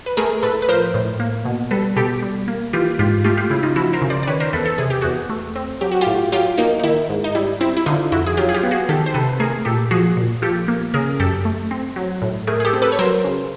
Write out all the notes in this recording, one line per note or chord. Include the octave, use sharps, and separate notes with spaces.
B4
A3 G#4 A#4
A2 A4 B4
B4
F3 A#4 C5
A2
A#3
B2
G3 A4 B4
B2 G4 A4
G3
A#3
E3 F4 G4
G#2 F4 G4
A3 F4 G4
F4 G4
C#3 E4
D#4 F4
F3 E4 F#4
A#4 C5
C#3
C5 D5
D5
D#3 B4 C#5
A#4 C5
E2 A4 B4
A4
C3 G#4
G4
E2 F#4 G#4
A3
C4
F#3 G4
F#4
F4 G4
A2
F#3 F4 G4
A#3 D#4
D#4
D#3 E4
G#2
D#4
G3 E4
C4 E4
E4
D3 D#4 F4
F2 E4 F#4
G#4
F#3 F4 G4
G#4
F4 G4
B3
F#4 G#4
D#3 G4 A4
C5
C3 A4 B4
A3 G#4 A#4
A#2 G4 A4
F3 F#4 G#4
A#2
F3 G4 A4
A#3
C#3 G#4 A#4
F#2 G4 A4
A3
C4
F#3
A2
A3 G#4 A#4
G#4
G4 A4
C4
A4 B4
C#5
F#3 A#4 C5
C#3